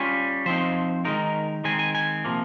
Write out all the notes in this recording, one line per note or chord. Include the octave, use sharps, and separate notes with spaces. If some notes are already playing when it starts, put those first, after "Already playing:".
Already playing: G3 C#4 F4 G#5
F3 C4 D#4 C5
D#3 G#3 D#4 A#4
D#3 G#3 C4 G#5
G#5
G#5
C3 F3 A#3